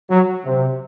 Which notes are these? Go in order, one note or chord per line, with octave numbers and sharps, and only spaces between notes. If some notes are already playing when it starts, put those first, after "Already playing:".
F#3
C3